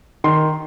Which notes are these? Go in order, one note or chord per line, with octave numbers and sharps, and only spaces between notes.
D#3 C6